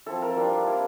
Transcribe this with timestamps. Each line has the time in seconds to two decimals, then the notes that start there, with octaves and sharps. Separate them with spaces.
0.06 F3 C4 E4 A4
0.22 A#4
0.37 G3 D4 F4
0.67 A#3 E4